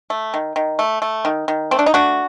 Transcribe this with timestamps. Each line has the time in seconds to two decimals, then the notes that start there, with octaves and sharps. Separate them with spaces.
0.10 A3
0.34 D#3
0.56 D#3
0.79 A3
1.02 A3
1.25 D#3
1.48 D#3
1.71 A3 C4
1.79 D4
1.86 D#4
1.94 A3 D4 F#4